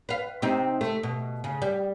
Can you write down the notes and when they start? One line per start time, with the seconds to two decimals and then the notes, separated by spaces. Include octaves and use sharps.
0.09 B4 F5
0.42 C3 C4 D#4
0.81 A3
1.03 B2
1.44 C#3
1.62 G3